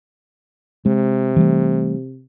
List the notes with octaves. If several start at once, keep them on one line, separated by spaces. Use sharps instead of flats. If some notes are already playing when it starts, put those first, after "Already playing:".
C3 G#3
E3 G3 A3